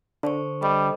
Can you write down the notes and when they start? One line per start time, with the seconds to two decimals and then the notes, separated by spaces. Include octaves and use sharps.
0.23 D3 A4 C5 C#6
0.62 G3 A4 C5 D#5